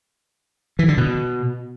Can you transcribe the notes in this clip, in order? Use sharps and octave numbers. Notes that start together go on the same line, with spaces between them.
E3
D3
B2